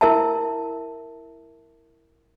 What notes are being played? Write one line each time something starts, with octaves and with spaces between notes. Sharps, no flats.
E4 A#4 E5 A5